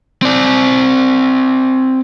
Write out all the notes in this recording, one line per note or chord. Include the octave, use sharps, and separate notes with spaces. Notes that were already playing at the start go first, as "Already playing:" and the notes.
C4 D5